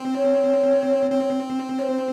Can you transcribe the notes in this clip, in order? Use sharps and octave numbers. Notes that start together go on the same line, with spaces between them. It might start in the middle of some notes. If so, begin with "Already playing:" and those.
Already playing: C4
C#5
C4
C#5
C5